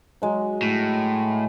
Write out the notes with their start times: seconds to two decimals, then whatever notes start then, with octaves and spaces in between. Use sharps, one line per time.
0.22 F#3 G#3
0.62 A2